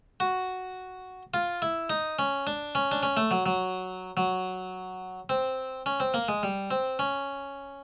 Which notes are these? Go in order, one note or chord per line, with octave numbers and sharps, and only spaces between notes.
F#4
F4
E4
D#4
C#4
D4
C#4
D4
C#4
A3
F#3
F#3
F#3
C4
C#4
C4
A#3
G#3
G3
C4
C#4